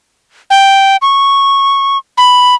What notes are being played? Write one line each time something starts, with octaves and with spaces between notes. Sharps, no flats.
G5
C#6
B5